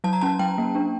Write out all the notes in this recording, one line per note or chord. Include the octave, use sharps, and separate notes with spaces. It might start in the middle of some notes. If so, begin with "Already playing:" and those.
F#3 A5
A#5
C#4 A5
F#3 G5
A#3
D4